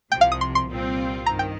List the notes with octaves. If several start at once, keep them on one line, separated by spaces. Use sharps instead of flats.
C2 C3 F3 G5
F5
D#6
C6
C6
C2 A#2 G3 C4 F4
G2 D#3 A#5
G5